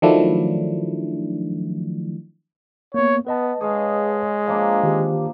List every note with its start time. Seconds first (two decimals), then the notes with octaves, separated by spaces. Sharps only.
0.02 D#3 F3 F#3 A3 D4 E4
2.94 A#3 B3 C#5
3.27 B3 B4 D#5 A5
3.61 G#3 G#4 C#5 F5
4.47 F3 A#3 D4 C#5
4.83 D#3 G4